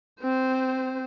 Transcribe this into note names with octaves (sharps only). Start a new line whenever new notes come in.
C4 C5